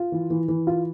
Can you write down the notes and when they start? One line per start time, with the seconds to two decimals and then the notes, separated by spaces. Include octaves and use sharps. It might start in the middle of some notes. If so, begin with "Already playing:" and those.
Already playing: F4
0.12 E3
0.30 E3
0.48 E3
0.67 F4